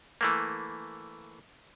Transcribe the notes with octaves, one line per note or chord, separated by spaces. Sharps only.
E3 A3 A#3